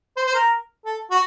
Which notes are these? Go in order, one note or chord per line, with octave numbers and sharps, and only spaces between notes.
C5
C5
A#4
A4
F#4